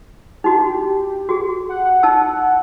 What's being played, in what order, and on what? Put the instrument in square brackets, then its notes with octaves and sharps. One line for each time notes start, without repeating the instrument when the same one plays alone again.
[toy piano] D#4 E4 F#4 [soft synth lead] G4
[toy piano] F#4 G#4
[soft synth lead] F#5
[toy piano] D#4 A5 E6